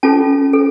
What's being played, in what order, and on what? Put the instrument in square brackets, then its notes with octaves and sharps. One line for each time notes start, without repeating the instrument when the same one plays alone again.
[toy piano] C#4 F4 A4 A5
A4